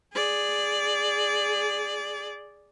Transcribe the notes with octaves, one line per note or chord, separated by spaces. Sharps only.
G#4 D5